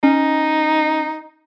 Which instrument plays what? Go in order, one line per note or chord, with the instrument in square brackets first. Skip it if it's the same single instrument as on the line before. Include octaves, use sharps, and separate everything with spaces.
[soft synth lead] C#4 [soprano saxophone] D#4